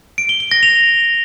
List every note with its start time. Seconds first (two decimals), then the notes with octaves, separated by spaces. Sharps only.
0.18 D7
0.29 G7
0.40 G7
0.51 A#6
0.63 F7